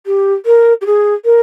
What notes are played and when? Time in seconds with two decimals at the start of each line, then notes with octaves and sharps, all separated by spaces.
0.06 G4
0.46 A#4
0.81 G4
0.86 G#4
1.25 A#4